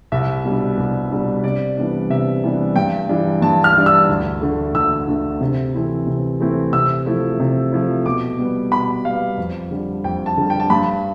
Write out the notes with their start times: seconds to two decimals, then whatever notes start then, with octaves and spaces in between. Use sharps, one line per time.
0.12 C2 E5
0.45 B2 G3 D4
0.77 C2
1.11 B2 G3 D4
1.44 C3 D5
1.77 E3 G3 B3 D4
2.10 C3 E5
2.44 E3 G3 B3 D4
2.76 G2 G5
3.09 E3 G3 D4
3.42 G2 A5
3.64 F6
3.75 E3 G3 D4
3.86 E6
4.09 D2
4.42 D3 A3
4.74 D2 E6
5.08 D3 A3
5.41 C3
5.74 E3 A3 C4 E4
6.07 C3
6.40 E3 A3 C4 E4
6.73 C3 E6
7.06 F3 A3 E4
7.40 C3
7.73 F3 A3 E4
8.06 B2 D6
8.39 G3 B3
8.72 B2 B5
9.05 G3 B3 F5
9.38 F2
9.71 D3 G3
10.04 F2 G5
10.26 A5
10.37 D3 G3
10.50 G5
10.60 A5
10.70 G2 B5